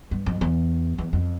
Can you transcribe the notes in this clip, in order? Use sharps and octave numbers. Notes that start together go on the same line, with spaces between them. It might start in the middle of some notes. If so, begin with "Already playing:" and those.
G2
F2
E2
E2
F2